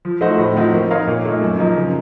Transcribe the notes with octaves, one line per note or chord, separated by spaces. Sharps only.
F3
A3 D#4 F#4 C5
A2
F3 C4 D#4 F#4
A#3
D#4 A#4 C#5 F5
A#2
A3 D#4
F#2
F3 A#3 D#4 A#4
C#3